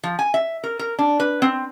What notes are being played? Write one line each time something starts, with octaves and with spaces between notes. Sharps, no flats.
F3
G#5
E5
A#4
A#4
D4
B4
C4